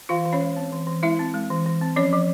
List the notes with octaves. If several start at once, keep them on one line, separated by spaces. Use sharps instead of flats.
E3 F4 F5
E3
C#4 C#5
G#3
C4
E3
E3
G#3 E4 E5
C4
G#3
E3
E3
C4
F3 C#4 C#5
F3